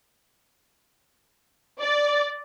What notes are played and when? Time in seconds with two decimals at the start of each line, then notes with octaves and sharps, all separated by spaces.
1.80 D5